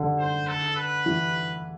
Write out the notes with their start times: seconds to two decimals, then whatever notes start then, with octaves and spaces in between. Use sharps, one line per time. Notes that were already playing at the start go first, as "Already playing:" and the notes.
Already playing: D3
0.19 C5
0.47 A4
0.76 B4
1.06 E3